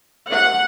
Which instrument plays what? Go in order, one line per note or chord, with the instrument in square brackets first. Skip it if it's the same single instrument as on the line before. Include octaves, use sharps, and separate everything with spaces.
[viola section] F#5